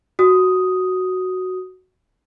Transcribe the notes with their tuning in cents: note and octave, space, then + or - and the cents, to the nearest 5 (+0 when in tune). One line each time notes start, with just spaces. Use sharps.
F#4 +0 D#6 +0